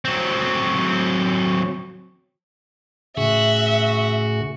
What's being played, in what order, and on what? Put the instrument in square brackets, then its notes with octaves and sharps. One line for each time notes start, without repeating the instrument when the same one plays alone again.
[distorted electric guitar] F#3 C4
[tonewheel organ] A2 C#3 G#4 [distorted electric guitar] F#4 [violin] E5